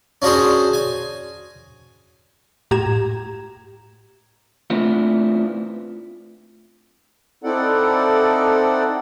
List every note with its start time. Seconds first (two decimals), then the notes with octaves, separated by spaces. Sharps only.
0.22 C#4 D4 F#4 G#4 C5
0.73 G#5
2.71 A2 G4 A#5 G#6 E7
4.70 A3 B3 C4 D4 E4 F4
7.44 C4 D#4 E4 A4 D5 F#5